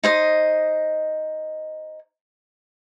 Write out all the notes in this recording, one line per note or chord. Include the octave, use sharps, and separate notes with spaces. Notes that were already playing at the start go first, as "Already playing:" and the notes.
D#4 C5 D#5